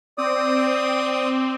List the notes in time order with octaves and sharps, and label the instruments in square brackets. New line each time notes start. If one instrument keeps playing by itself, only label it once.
[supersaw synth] C4 [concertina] D5 D#6